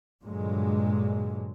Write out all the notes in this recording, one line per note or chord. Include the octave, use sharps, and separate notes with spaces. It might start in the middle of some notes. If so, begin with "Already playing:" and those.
G2 A#2 D3 F#3 G#3